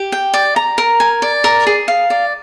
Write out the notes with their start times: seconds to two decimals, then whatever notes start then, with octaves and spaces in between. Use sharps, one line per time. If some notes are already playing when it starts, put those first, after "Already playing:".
Already playing: G4
0.12 G5
0.34 D5
0.56 A#5
0.78 A#4
1.00 G#5
1.22 D5
1.44 A#4
1.67 G#4
1.88 F5
2.10 D5